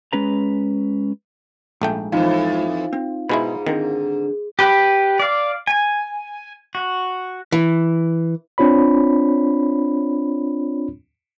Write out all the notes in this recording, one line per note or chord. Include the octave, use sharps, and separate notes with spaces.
G#3 C#4 B4 A#5
A#1 G#2 A3 G5
F2 E3 D#4 F4 F5
C4
G#2 B2 G#3 E4 B5
D3 D#3 C4 A#4
G4 B4
D5 F5
G#5
F#4
E3
C4 D4 F4 C#5 B5